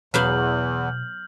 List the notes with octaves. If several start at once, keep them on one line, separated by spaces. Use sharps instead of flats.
E2 B2 F#3 B3 F5 F6 G6 F#7